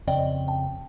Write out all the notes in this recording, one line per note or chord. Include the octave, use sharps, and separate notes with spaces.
F2 C#3 C4 D5 D#5 G5
G5 A5